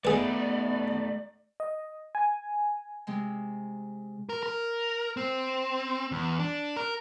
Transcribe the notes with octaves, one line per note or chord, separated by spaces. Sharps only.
A3 B3 D#4 G#4 B4 D5
D#5
G#5
C3 G#3 C4
A#4
A#4
C4
E2
D4
A#4